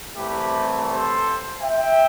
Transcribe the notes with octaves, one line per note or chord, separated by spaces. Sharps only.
C2 C3 E3 A3 G4 B4
A4 C5
E5 G5